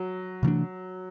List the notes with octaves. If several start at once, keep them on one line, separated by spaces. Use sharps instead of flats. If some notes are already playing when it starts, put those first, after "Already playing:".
Already playing: F#3
C3 E3 A3 D4